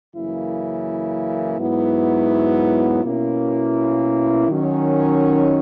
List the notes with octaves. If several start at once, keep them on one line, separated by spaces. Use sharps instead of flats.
F#2 C#3 E3 A#3 E4
G#2 F#3 B3 E4
B2 A#3 C#4 E4
D#3 F#3 C#4